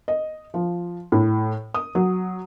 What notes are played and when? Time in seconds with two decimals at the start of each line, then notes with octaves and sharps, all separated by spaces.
0.08 D#5
0.54 F3
1.12 A2
1.74 D#6
1.95 F#3